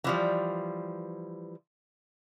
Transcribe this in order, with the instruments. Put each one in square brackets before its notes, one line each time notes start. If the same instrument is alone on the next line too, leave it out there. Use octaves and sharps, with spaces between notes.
[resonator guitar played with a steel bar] E3 F3 G3